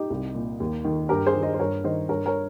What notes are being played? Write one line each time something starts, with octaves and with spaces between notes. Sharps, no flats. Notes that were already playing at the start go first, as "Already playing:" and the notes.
Already playing: D#4 G4
C2
A#2
D#2
D#3
G2 G4 A#4
G#4 C5
D#3
C5 D#5
C5
G2 A#4 C#5
D#3 C5 D#5
G2 A#4 C#5
A#4 C#5